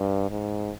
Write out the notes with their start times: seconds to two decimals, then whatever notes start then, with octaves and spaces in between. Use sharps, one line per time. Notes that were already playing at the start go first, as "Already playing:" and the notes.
Already playing: G2
0.31 G#2